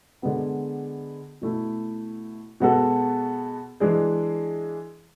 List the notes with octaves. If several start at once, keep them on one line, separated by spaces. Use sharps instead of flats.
D3 G#3 B3 F#4
B2 A3 E4
B2 G#3 B3 F#4 A4
E3 G#3 D4 G#4